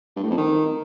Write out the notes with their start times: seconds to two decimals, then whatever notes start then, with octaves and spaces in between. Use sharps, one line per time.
0.16 G2
0.23 A2
0.30 F2
0.37 D#3